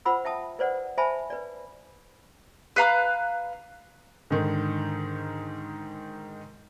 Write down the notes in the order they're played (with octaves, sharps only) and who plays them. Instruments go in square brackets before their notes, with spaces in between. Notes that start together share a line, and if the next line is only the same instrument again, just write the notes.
[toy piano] F4 C5 F#5 B5 E6
E5 G5 A5 D#6
B4 C5 D5 F#5
C5 E5 G#5 A5 B5
B4 D5
[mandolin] B4 F5 A#5 F#6
[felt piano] G#2 D3 D#3